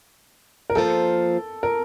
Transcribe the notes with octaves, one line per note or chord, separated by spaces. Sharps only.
A#4
F3 A#3 F4 A4 C5
A#4